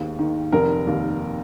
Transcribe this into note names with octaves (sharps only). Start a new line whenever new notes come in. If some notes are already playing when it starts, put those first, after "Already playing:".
Already playing: G#1 D#2 G#2
D#3
F1 A#4
D#2